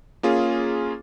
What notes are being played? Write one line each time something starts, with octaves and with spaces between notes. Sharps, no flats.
A#3 C#4 F4 G#4